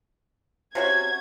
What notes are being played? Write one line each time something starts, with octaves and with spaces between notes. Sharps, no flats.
C3 C#4 F#4 G#6